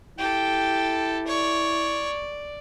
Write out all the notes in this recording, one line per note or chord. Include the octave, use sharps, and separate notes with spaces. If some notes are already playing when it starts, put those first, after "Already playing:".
E4 G4 A4 G5
C#5 D5